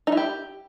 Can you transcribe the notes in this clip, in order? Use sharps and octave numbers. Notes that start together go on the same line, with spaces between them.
D#4
E4
G4